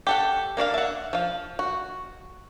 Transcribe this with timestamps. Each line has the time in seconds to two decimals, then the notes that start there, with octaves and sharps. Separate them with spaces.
0.07 G4 A4 F#5
0.57 A#3 D4 D5 F5
0.74 E5 F#5
1.13 F3 F5
1.59 F#4